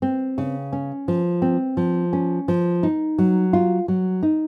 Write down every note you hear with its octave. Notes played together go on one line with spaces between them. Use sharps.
C4
C#3
C#4
F3
C4
F3
C#4
F3
D#4
F#3
F4
F#3
D#4